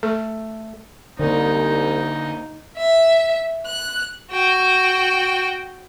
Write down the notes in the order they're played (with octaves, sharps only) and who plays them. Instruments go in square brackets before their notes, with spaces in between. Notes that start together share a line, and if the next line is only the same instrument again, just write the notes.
[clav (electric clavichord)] A3 [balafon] A4
[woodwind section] C2 [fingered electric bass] D3 A#3 [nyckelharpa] D#4
[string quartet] E5
F#6
[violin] F#4 G5